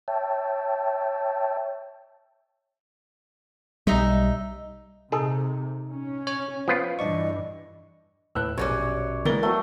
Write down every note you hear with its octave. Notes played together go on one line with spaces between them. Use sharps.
C#5 E5 G5 A5
B1 G3 D#4 D#5 E5
C3 D#4 G#4 A4
C#4
C#5
F3 B3 F4
G2 E3 D4 D5 D#5 C#6
D#2 A2 B4 E6 F#6
A#1 F#2 B2 G3 C#4 C#5 D6
E3 G#3 A#3 B3 A#4 A6 G7
F#3 A3 G5